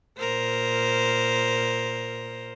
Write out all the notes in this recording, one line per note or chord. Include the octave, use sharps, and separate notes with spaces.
A#2 A#4 C5